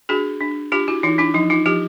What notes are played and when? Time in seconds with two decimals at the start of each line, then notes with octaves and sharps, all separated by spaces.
0.09 D4 F#4 G#4
0.41 D4
0.72 D4 F4 G4
0.88 E4 F#4
1.03 E3 D#4 F4
1.18 D4 E4
1.34 F3 D#4
1.50 D#4 F4
1.66 F3 F4 G4